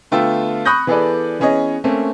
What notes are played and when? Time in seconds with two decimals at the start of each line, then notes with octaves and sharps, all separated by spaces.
0.11 D3 A3 B3 F4 G5 E6
0.65 B5 C#6 D#6 F#6 G6 A#6
0.87 E3 B3 G#4 A4 B4 D5
1.39 E3 B3 C#4 G#4 C#5 D#5
1.84 A3 A#3 C4 C#4